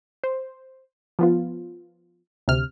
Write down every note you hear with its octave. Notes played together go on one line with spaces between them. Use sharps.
C5
F3 B3 F4
D2 C3 F6